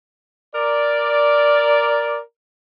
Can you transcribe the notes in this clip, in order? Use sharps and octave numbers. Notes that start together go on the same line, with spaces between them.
A#4 D5